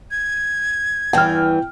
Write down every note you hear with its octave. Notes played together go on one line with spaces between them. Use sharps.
G#6
E2 G2 E3 G5 F6